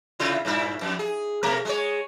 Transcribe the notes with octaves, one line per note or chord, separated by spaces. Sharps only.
C3 E4 F4
G2 A#2 E4
F2
G#4
B2 A3 A#4
G#3 G#4 C#5